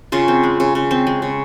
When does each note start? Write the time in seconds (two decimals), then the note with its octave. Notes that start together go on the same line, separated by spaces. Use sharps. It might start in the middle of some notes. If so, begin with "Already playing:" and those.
0.12 C#3 F4
0.28 C4
0.43 G#3
0.60 C#3
0.75 C#3
0.91 C4
1.07 G#3
1.22 C#3